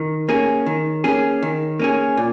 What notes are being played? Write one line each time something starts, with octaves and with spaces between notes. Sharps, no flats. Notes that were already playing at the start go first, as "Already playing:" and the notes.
Already playing: D#3
A#3 C#4 G#4
D#3
A#3 C#4 G#4
D#3
A#3 C#4 G#4
A#2